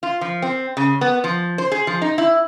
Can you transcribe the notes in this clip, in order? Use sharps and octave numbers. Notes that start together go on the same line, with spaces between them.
F4
F3
C4
C#3
B3
F3
C5
G#4
F3
D#4
E4